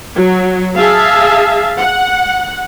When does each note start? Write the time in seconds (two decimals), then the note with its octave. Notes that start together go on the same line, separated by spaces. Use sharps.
0.16 F#3
0.76 G#4 E5 F5 A5
1.79 F#5